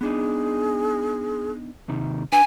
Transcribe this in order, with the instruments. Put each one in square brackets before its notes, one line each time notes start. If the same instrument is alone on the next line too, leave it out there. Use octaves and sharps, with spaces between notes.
[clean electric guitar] B3 D4 D#4 [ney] G#4
[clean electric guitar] D#2 C3 D#3
[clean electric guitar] D4 B4 [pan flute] G#5